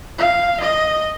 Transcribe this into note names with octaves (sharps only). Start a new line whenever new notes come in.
F5
D#5